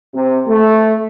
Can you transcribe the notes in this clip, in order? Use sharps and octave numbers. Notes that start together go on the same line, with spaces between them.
C3
A3